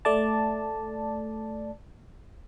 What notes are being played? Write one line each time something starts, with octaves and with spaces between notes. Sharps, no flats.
A3 D5 A5